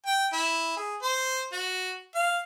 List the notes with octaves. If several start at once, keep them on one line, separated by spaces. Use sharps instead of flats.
G5
E4
G#4
C5
F#4
F5